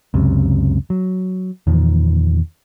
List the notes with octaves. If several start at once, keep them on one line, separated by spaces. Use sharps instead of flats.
C#2 F#2 C3
F#3
E2 A#2 D#3 F3